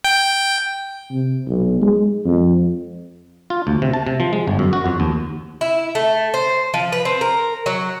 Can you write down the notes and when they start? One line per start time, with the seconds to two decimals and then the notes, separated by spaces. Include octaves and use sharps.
0.05 G5
1.11 C3
1.47 B1
1.81 G#3
2.26 F2
3.50 F4
3.67 D2
3.82 C3
3.94 A5
4.07 C3
4.20 F3
4.33 G#3
4.48 G1
4.59 F#2
4.73 F#4
4.86 F2
5.00 D#2
5.61 E4
5.95 A3
6.34 C5
6.74 F3
6.92 B4
7.05 C4
7.21 A#4
7.66 F#3